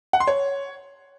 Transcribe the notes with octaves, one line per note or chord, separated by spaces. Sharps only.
F#5
C6
C#5